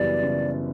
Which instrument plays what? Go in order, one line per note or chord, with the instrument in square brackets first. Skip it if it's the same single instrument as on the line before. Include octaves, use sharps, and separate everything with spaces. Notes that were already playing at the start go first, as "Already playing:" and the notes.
Already playing: [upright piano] F#1 F#2 E3 G3 B3 [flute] D5
[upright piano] F#1